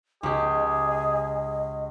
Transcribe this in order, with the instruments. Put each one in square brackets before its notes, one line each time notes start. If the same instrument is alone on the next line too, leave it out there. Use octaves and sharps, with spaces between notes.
[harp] C#2 G4 [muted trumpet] G#4 [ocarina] D#5